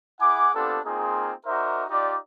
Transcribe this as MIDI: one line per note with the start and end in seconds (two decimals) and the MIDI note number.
0.21 0.50 64
0.21 0.50 68
0.21 0.50 78
0.21 0.50 80
0.21 0.50 86
0.56 0.79 59
0.56 0.79 60
0.56 0.79 62
0.56 0.79 65
0.56 0.79 67
0.56 0.79 69
0.85 1.32 58
0.85 1.32 60
0.85 1.32 63
0.85 1.32 65
0.85 1.32 68
1.46 1.85 63
1.46 1.85 66
1.46 1.85 70
1.46 1.85 72
1.46 1.85 74
1.46 1.85 76
1.90 2.17 63
1.90 2.17 65
1.90 2.17 67
1.90 2.17 74